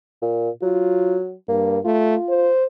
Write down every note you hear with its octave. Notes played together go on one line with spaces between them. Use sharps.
A#2
F#3 F4
G2 A#3
A3 F4
C5